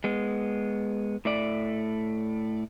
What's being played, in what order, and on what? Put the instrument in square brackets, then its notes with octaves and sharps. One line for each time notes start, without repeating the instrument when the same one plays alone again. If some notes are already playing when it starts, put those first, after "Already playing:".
[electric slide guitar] G#3 B3
A2 A3 D5